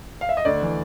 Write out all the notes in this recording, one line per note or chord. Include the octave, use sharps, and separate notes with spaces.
F5
E5
D#5
D2 D5
E3